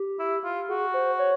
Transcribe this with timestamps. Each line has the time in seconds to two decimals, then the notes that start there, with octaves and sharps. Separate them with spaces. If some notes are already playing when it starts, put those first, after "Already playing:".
Already playing: G4
0.19 E4
0.44 F4
0.69 F#4 G#4
0.94 C5
1.19 C#5